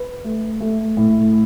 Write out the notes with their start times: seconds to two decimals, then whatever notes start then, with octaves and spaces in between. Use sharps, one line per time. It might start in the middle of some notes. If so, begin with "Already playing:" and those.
Already playing: B4
0.24 A3
0.61 A3
0.97 A2